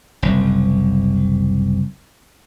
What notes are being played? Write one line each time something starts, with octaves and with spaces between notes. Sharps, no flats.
F#1 C2